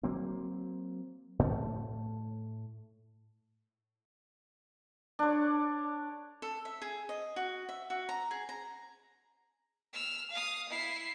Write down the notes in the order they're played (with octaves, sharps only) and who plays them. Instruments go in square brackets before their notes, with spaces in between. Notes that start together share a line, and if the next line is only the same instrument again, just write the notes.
[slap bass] F#3 A#3 C4
A2 A3
[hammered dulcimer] D4 C#5
[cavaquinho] A4
E5
G#4
D#5
F#4
E5
F#4
A#5
G#4
A#5
[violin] E6 F6
F5 D#6
E4 C7